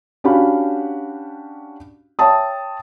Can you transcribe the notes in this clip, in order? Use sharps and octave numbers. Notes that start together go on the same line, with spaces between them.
C#4 D4 F#4 G4 F5 B5
C#5 E5 G5 A5 D#6